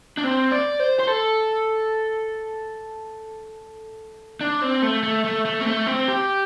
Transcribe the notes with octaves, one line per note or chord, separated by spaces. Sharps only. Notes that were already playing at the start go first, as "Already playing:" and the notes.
D4
C4
D5
C5
C5
A4
D4
C4
A3
A3
A3
A3
C4
A3
C4
G4